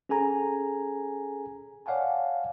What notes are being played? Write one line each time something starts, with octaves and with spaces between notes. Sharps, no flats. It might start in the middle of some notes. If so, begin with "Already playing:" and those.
C#4 G#4 A4 G#5 A#5
C#5 D5 F5 F#5 G#5 A5